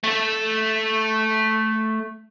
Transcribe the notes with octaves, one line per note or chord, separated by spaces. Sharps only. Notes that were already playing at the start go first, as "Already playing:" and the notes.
A3 A4